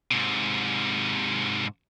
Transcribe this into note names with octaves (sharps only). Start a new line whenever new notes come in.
G#2 C3